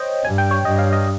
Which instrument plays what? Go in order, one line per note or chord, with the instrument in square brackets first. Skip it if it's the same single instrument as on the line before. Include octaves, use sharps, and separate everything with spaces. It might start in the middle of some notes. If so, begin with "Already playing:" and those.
Already playing: [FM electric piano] C5 C#5 D#5 G5
[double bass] G2 [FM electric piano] G#5
[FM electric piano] G5
C#5
[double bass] G2 [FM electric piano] D#5
[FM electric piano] F5
D#5